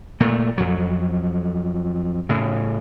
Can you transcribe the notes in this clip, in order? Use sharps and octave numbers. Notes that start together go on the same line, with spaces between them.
A#2 A3
F2 F#3
A2 C#3